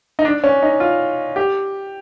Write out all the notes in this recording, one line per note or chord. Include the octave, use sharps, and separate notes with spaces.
D#4
D4
C#4
D#4
F4
G4